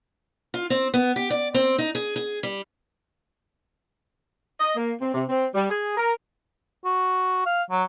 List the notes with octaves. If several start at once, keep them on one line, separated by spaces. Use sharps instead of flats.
F4
C4
B3
G4
D5
C4
D#4
G#4
G#4
G3
D#5
A#3
C4
C3
C4
G3
G#4
A#4
F#4
F5
F#3